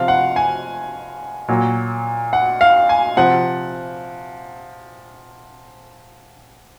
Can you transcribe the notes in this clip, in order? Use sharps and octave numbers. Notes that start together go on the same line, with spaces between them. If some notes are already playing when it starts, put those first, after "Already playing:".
Already playing: C3 F3 F5
F#5
G#5
A#2 F#3
F#5
F5
G#5
C3 F3 F#5